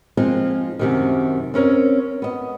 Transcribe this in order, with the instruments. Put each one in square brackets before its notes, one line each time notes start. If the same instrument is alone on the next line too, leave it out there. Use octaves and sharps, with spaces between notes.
[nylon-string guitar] F3 G#3 A#3 C4 D#4 F4
F#2 C3 D#3
C4 C#4 A#4 C#5
B3 D#5